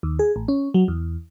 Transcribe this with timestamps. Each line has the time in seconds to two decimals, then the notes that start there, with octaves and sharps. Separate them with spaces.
0.03 D#2
0.19 G#4
0.36 A1
0.48 C#4
0.74 F#3
0.88 E2